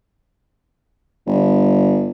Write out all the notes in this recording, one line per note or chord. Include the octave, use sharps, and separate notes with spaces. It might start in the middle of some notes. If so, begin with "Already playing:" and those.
G1